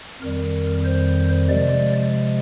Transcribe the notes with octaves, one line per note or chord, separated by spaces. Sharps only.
F2 D#3 G3 A#4
C5
C3 F3 G#3 D5